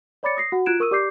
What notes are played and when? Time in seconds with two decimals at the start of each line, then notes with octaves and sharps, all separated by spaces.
0.23 C#5 D5 B5 D6 A6 C#7
0.37 D#6 A#6 C7
0.52 F#4 F#5
0.66 F4 F#6 G#6 D7 E7
0.80 A#4 C#6 D#6 E6 D#7
0.91 G4 D5 D6 G6 C7